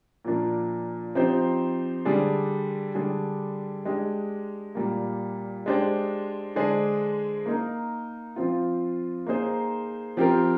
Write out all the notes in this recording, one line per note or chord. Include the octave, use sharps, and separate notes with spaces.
A#2 F3 A#3 D4
F3 C4 D#4 G4 C5
D3 G3 D4 G#4
D3 G3 D4 G#4
G#3 D4 G4
A#2 G3 A#3
G#3 D4 G4 C5
D3 G#3 D4 G#4 C5
A#3 D#4 A#4
F3 C4 F4
A#3 D#4 G#4 C5
F3 C4 G4 A#4